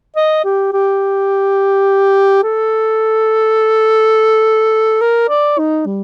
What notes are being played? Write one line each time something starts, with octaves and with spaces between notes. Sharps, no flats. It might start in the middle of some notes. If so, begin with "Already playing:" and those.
D#5
G4
G4
A4
A#4
D5
D#4
G3